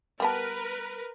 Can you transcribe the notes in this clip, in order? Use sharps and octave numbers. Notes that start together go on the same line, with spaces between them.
G3 B3 A#4 B4 A5